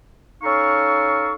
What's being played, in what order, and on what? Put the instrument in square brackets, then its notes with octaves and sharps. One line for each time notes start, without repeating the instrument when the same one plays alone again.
[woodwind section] C#4 D#4 A4 F5 C#6